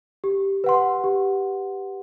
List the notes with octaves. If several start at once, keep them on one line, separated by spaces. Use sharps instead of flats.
G4
B4 F#5 C6
G4